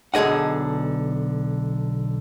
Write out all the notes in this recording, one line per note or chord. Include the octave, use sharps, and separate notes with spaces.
B1 D3 G#4 D#5 F#5